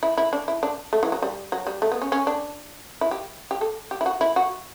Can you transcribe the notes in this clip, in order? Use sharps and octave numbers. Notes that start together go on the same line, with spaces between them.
E4
E4
D4
E4
D4
A3
E3
F#3
G3
F#3
G3
A3
B3
C#4
C#4
D4
E4
G4
G4
A4
G4
E4
F#4
E4
F#4